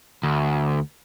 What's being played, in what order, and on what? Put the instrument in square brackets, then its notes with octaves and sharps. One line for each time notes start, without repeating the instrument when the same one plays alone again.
[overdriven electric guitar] D2